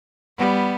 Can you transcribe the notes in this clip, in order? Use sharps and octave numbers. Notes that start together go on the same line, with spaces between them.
G3 B3